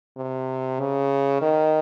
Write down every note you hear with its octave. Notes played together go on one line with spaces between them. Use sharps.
C3
C#3
D#3